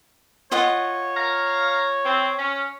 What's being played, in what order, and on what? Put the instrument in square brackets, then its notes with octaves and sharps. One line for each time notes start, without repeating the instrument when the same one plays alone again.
[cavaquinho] F4 D#5 F#5 [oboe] C#5
[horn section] F5 A#5
C4
C#4